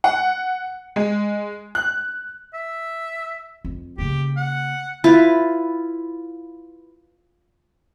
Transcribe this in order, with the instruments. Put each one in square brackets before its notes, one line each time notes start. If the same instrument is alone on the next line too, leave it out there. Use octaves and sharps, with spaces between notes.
[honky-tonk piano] F#5
G#3
F#6
[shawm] E5
[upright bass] F2
[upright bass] C#3 A#3 [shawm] G4
[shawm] F#5
[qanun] E4 F4 B4